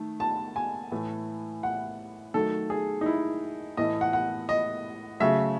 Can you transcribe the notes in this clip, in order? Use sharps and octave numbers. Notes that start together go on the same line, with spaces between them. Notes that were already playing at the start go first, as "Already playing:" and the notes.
Already playing: D#3 A3
A5
G#5
A2 E3 A3
F#5
D#3 F#3 A3 A4
G#4
D#4
E4
A2 E3 A3 D#5
F#5
F#5
D#5
C#3 F#3 A3 E5